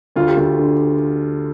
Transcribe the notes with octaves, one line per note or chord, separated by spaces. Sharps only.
D2 F4
G4
D2 F4
D3